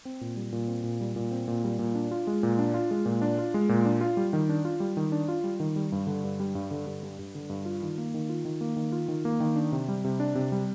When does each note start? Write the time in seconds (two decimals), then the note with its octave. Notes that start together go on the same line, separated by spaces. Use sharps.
0.05 C4
0.21 A#2
0.36 G3
0.52 A#2
0.68 C4
0.83 A#2
1.00 G3
1.16 A#2
1.32 C4
1.48 A#2
1.64 G3
1.79 A#2
1.95 D4
2.11 F4
2.27 G#3
2.43 A#2
2.59 D4
2.74 F4
2.91 G#3
3.06 A#2
3.22 D4
3.38 F4
3.54 G#3
3.69 A#2
3.86 D4
4.01 F4
4.17 G3
4.33 D#3
4.49 D4
4.65 F4
4.80 G3
4.97 D#3
5.12 D4
5.28 F4
5.44 G3
5.60 D#3
5.76 G3
5.92 G2
6.07 D3
6.24 G2
6.40 G3
6.55 G2
6.71 D3
6.87 G2
7.03 G3
7.19 G2
7.35 D3
7.50 G2
7.65 F4
7.82 D#3
7.98 A#3
8.14 D#3
8.29 F4
8.45 D#3
8.61 A#3
8.76 D#3
8.92 F4
9.08 D#3
9.25 A#3
9.40 D#3
9.56 D4
9.72 C3
9.88 G3
10.04 C3
10.20 D4
10.35 C3
10.52 G3